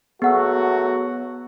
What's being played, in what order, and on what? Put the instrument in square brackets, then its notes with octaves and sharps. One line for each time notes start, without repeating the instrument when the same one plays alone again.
[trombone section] F#3 A3 F#4 [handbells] B3 [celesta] G#4 F#5 E6